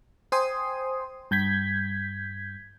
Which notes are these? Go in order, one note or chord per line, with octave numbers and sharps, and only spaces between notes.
C5 G5 G#5 C6 D#6
G2 G6 G#6 B6